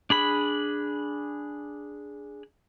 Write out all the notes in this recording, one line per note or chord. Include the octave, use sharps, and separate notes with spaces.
D4 G#4 B5